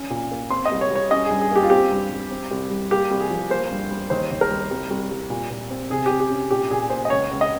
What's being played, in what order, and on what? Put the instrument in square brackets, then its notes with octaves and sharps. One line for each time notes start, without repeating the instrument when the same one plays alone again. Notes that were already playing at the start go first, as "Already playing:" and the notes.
Already playing: [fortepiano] C#4
A#2
A#3
C4 C6
D#5
C2
C#5
G3
C#5
C#4 D#5
G#4
G2
G#4
A#3 G4
F4
C4 G4
G2
G3
C4
C2
G3
A#3 G4
C2
G#4
F3
A#3 C5
G2
G3
D#2 C5
D#2
A#4
G3
C2
C2
G3
A#2
A#2
C4
C3 G#4
C3 G4
G4
C#4
A#2 G4
A#2 G#4
A#3 C5
D#5
C#2 C#5
C#2
D#5